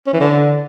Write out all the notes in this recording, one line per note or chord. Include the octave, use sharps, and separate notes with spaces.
C#4
E3
D3